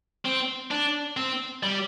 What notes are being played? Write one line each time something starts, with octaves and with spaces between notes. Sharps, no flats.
C4
D4
C4
G3